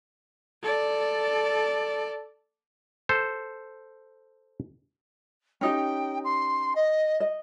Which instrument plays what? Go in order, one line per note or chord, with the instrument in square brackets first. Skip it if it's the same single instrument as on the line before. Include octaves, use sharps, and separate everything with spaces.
[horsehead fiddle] A4 D5
[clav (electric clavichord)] A4 C5
[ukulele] C#4 D#4 G4 [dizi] G5
[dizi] C6
D#5
[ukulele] D#5